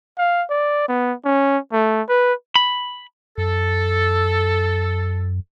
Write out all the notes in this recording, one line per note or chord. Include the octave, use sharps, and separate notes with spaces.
F5
D5
B3
C#4
A3
B4
B5
F#2 A4